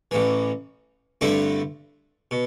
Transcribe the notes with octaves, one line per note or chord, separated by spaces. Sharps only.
A1 A2 E3
G2 D3 A3 C4 E4
B2